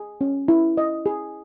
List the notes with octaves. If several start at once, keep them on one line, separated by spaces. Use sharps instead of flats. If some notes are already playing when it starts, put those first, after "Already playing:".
Already playing: G#4
C#4
E4
D#5
G#4